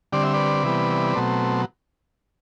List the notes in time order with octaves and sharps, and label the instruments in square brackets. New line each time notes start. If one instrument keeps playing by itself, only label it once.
[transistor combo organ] D3 G3 C4 D5
E5
B4 D5
C3 E3 G3 B3
B2 F#3 A3 C4